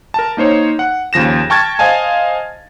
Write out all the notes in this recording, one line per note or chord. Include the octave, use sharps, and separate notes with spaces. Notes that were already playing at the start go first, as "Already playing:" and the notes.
A#4 A5
A#3 D#4 C5 C#5
F#5
D#2 C#3 F3 A#6 E7
G5 A5 C#6 F6 G#6 A6
C5 D#5 F5 G#5 A5